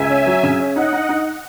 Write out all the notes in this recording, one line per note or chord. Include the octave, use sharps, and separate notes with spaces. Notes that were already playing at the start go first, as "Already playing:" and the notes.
Already playing: C#2 E5 G#5
C#4
F#3
C#3
C#4
D#4 D#5 F#5
D#4
D#4